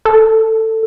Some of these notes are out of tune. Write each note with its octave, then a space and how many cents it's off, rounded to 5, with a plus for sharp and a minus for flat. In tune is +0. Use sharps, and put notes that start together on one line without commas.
A4 +15